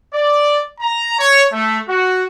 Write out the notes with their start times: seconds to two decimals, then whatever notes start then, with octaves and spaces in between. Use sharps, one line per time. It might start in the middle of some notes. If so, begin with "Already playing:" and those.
0.14 D5
0.81 A#5
1.19 C#5
1.52 A3
1.89 F#4